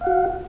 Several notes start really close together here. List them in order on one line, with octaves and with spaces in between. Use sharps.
F5 F#5 F#4